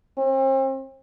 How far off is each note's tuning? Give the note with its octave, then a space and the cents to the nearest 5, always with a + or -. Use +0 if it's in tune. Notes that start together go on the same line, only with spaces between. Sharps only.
C4 +40